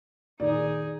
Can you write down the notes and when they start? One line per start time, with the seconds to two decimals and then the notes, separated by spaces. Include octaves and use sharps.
0.40 A#2 D#3 D#4 G#4 D5